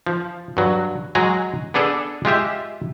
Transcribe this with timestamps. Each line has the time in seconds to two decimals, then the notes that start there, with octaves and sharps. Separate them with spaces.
0.07 F3
0.57 G2 F#3
1.15 F#3 G#3 G#4 A#5
1.74 B3 D4 G#4 A4 D5
2.25 G#3 F4 G4 E5